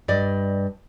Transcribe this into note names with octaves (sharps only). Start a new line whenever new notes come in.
G2 D5 D#5